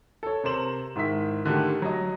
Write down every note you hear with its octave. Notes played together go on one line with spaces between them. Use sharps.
A4 C#5
C3 A#4 C5 E7 F#7
G#2 D#3 E4 E5 B6
D3 D#3 A3 G4
F#3 D#5